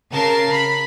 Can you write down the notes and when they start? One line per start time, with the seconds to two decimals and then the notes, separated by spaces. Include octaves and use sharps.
0.11 C#3 A#4 A5 C7
0.53 B5